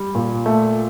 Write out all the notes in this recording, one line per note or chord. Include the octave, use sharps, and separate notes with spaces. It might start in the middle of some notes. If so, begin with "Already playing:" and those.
Already playing: G3
A#2
A3